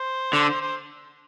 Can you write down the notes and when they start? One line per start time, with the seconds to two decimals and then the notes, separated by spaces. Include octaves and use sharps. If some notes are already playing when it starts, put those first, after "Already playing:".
Already playing: C5
0.33 D3
0.62 C5